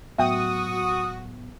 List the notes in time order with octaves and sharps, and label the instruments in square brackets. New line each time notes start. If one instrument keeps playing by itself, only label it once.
[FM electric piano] A2 F#3 B3 [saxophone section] F#4 [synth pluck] E5 G5 [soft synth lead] D#6